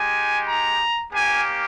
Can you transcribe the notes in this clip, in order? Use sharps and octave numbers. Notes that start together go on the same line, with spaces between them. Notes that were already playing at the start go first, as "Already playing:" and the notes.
Already playing: G#3 D#4 G4 G#5
A#5
A#3 C#4 G4 G#5